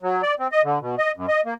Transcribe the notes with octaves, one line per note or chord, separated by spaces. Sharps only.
F#3
D5
C4
D#5
D3
B2
D#5
F#2
D#5
A#3